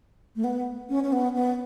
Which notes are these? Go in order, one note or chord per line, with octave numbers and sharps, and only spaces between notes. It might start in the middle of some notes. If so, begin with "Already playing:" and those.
A3
B3
C#4
C#4
B3
B3